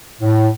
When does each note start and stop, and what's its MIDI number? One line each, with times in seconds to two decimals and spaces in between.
0.21 0.48 45